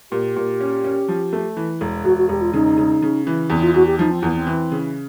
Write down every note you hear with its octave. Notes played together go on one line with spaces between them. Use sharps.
A#2 G4
A#2
C#4
C#4
F3
A3
E3
E1
E1 F#4
F#4
E1 G4
F4
C#3 D#4
C#3
C#3
E3
E2 C4
F4
E2 F#4
G4
F3 D#4
C4
E2 B3
C4
E3
C#3